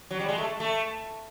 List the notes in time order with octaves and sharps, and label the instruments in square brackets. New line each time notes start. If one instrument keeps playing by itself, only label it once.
[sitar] F#3
G3
G#3
A3
A3